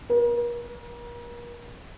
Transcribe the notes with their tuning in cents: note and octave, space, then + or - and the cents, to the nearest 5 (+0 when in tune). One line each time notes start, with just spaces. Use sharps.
A#4 +40